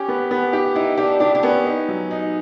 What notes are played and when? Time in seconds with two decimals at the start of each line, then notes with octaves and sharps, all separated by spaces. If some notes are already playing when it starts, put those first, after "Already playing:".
Already playing: C#4 G4
0.08 B3
0.31 B3
0.53 G4
0.75 D#4 E4
0.97 D4 G4
1.20 D4 G4
1.35 D4
1.43 B3 C#4
1.65 D#4
1.89 F#3
2.11 D#4